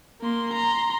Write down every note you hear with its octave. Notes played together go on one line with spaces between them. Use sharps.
A#3 C6
A#5 C6